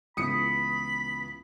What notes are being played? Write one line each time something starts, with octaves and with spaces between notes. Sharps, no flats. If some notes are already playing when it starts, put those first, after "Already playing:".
C#2 E3 B3 B5 D#6 C#7